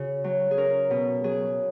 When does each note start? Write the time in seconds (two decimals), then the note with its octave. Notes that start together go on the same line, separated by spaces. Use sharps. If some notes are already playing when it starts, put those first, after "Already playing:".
Already playing: C#3 C#4 F#4
0.24 F#3
0.51 G#4
0.58 C#4 A#4
0.90 B2
1.24 F#3 G#4